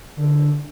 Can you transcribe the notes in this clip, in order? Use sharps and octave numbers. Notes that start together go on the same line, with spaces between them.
D3